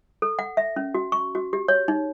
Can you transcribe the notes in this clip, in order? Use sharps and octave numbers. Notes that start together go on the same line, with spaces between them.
A4
F#5
E5
C#4
F#4
C#6
F#4
G4
C#5
D#4